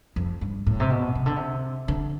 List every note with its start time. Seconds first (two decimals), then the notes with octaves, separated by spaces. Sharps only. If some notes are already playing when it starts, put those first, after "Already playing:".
0.16 F2
0.41 G2
0.67 A2
0.80 C3
0.90 B2
1.15 C3
1.26 D3
1.36 C3
1.88 D3